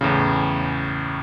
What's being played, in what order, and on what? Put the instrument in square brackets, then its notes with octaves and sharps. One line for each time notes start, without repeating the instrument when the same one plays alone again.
[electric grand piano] E2 A2 C#3